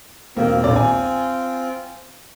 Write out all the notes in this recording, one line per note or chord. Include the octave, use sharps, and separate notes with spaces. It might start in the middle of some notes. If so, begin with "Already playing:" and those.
E1 A#3 C4 F4
A#1 D#2 D5
G#5